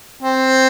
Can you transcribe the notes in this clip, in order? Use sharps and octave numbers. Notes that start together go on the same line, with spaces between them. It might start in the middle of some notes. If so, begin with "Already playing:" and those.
C4